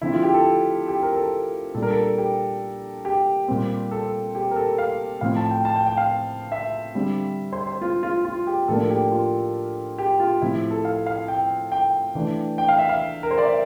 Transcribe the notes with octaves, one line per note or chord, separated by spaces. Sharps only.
D3 F3 C4 E4
F4
G4
A4
G4
A#4
A4
A#2 G3 D4 A4
A#4
A4
G4
G4
A#2 G3 C4
A4
G4
A#4
A4
F5
A2 F3 C4 F5
A5
G5
A5
G5
G5
F5
E5
D3 G3 C4
C5
C5
F4
F4
F4
G4
A2 F3 A#3 D4 A4
G4
F4
G4
F4
A2 F3 C4 E4
A4
F5
F5
G5
G5
E3 A3 D4
G5
F5
E5
F5
A#4
C5
D5
E5